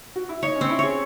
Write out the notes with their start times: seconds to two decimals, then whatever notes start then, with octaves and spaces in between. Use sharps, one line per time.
0.16 F#4
0.29 E4
0.43 D#4 C#5
0.56 C#4
0.61 C4
0.70 E4
0.79 G#4 C#5